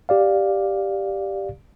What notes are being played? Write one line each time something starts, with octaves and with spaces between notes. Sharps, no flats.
G4 D5 F5